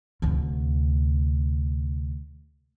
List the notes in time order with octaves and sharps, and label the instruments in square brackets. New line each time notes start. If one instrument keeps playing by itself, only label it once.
[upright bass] D2 C3